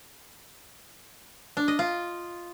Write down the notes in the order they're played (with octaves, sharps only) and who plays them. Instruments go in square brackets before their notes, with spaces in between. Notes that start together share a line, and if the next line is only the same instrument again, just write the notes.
[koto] D4
D#5
F4